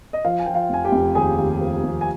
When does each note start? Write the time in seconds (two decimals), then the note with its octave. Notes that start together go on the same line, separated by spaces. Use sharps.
0.13 D#5
0.24 F3 F4 F5
0.39 G#5
0.46 F3 G5
0.54 F4 F5
0.70 F1 G#5
0.85 G4 G5
0.92 F1
1.15 D#2 G#4 G#5
1.38 D#2
1.61 F3
1.84 F1
2.01 G#5